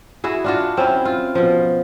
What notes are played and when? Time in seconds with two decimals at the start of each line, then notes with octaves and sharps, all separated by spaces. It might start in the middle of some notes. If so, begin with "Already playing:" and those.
0.24 E4 F#4 G#4
0.44 D4 F4 F#4
0.77 C4 C#4 E4
1.05 F4
1.35 B2 F3